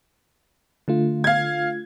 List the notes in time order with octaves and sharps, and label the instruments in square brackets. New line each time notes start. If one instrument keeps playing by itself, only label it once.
[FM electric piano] D3 A3 F4
[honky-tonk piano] F5 G#6